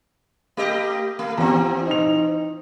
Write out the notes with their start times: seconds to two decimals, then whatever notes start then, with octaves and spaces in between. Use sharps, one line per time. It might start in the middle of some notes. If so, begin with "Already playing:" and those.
0.57 A3 G4 D#5
1.19 A3
1.37 E2 E3 C4 G4 A#5
1.87 D#4 F7